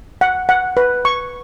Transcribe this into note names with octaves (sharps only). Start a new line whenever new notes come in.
F#5
F#5
B4
C#6